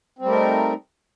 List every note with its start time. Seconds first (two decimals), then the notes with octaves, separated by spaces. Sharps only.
0.19 C4
0.22 G3
0.26 A3
0.29 A#4
0.32 D#4